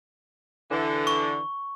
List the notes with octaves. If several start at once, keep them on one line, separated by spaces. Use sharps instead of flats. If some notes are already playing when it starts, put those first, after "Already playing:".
D3 E3
C#6